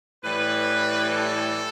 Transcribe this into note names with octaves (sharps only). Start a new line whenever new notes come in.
A2 E3 G3 B4
A4